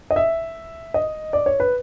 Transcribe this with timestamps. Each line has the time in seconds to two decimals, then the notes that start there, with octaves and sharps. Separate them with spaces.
0.11 D#5
0.16 E5
0.94 D#5
1.33 D5
1.46 C#5
1.60 B4